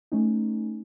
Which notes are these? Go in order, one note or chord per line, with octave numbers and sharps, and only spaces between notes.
A3 C#4 D#4